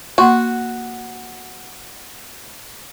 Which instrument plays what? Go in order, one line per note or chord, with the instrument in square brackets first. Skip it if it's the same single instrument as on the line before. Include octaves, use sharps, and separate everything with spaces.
[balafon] A#3 F#5 C6 [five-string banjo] F#4